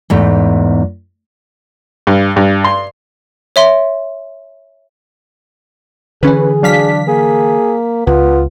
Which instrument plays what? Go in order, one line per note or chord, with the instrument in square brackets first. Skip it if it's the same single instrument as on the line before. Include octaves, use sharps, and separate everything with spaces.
[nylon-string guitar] E2 G#2 A3
[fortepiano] G2
G2
C6
[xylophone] C#5 E5 C6
[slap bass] D3 E3 [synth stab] C#4 B4 [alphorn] G#4
[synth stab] F#3 F5 B6 [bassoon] D4
[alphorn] A#3 [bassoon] G#4
[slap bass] C#2 [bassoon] B3 [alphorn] F4